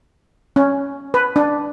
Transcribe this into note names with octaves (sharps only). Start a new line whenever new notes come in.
C#4
B4
D4